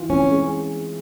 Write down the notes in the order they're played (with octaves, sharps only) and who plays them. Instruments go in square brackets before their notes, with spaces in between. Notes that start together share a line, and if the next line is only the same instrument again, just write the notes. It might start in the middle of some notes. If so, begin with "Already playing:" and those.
Already playing: [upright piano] E3 F4
[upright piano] C4 [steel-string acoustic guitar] C#4
[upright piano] G#3